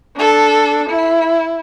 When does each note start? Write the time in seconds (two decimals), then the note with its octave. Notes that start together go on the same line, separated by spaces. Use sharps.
0.17 D4 A4
0.89 E4